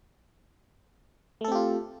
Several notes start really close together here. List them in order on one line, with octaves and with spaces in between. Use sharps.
A3 A4 C4 G4 F4